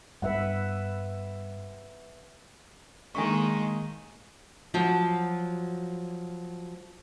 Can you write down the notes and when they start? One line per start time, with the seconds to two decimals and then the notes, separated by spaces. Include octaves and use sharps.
0.22 G2 B4 E5 F#5
3.15 D#3 G#3 A#3 G#5 C#6
4.74 F3 F#3 F#4